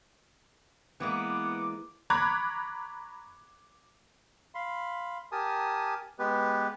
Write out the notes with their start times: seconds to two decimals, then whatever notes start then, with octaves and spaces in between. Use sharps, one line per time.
1.00 E3 G#3 A#3 B3 D6
2.10 A#5 B5 C#6 D6 F#6 G#6
4.55 F5 B5 C6
5.32 G4 A#4 G#5 A5 D#6
6.19 G#3 B3 G4 B4